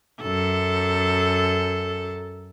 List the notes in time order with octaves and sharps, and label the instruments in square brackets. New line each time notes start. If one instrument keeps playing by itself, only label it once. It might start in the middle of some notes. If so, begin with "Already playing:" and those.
[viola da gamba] F#2 A4